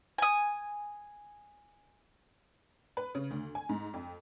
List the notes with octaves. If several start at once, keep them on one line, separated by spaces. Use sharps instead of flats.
G#5 D#6
B4
C#3
D2
G#5
G#2
F2